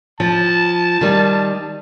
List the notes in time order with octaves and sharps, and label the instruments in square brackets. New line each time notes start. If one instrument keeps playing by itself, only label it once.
[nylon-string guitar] F3 [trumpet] A5
[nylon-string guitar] D#3 G3